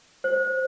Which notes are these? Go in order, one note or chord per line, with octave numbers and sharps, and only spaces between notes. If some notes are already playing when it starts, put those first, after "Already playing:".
C5